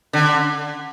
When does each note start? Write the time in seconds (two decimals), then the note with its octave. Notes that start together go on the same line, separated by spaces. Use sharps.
0.13 D3